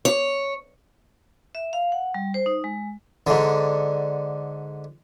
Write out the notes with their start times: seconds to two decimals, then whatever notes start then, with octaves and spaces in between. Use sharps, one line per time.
0.05 C#5
1.55 E5
1.73 F5
1.92 F#5
2.14 G3
2.34 C5
2.46 D#4
2.64 G#3
3.27 G#2 D3